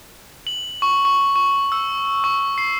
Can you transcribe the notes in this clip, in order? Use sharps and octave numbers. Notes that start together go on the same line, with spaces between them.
F#7
C#6
C#6
C#6
E6
C#6
C7